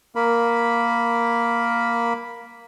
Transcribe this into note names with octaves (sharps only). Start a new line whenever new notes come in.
A#3 A#4 B5